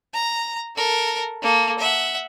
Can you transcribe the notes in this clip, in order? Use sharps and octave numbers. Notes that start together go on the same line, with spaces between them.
A#5
A4 A#4
A#3 A4
E5 F#5